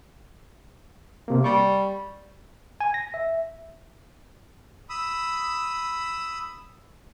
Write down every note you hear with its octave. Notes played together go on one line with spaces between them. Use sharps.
C3 A#3
G3 C#6
G#5
A#6
E5
B5 D#6 E6